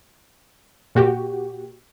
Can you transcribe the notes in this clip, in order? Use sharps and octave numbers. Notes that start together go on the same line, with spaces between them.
A#2 F#4 G4